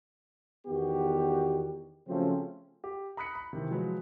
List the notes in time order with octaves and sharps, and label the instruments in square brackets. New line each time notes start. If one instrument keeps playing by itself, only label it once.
[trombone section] E2 D#3 B3 F#4 G4
C#3 F3 F#3 A3 C4 C#4
[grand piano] G4
A#5 B5 D#6 F#6 B6 C#7
B5
C3 D#3 E3 C4
F3 F#3 G#3 F4 B4